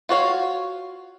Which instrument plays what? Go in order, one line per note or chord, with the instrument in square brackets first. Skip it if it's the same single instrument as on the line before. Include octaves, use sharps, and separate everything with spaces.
[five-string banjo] F4 F#4 C#5 F5